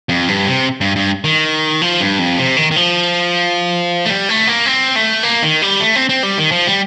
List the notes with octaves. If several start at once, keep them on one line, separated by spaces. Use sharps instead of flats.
F2
G2
C3
G2
G2
D#3
F3
G2
F2
C3
D#3
D#3
F3
A3
G3
A3
A#3
C4
A3
A#3
D#3
G3
A3
C4
C4
G3
D#3
F3
G3